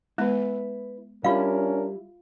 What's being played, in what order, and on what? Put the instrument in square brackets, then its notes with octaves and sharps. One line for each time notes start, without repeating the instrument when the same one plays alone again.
[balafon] G#3 B3 [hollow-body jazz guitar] E4 B4
[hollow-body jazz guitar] G3 E4 [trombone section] C#4 D4 A#4 [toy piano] F4 F5